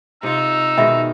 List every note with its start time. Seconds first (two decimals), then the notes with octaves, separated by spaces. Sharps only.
0.23 C3 D#4 F4 E6
0.78 B2 D#3 G#3 E5